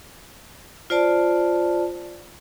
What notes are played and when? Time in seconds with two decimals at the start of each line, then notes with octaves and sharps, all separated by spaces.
0.90 F4 C5 D5 A5